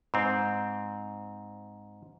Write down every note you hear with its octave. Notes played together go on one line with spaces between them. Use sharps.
G#2 C4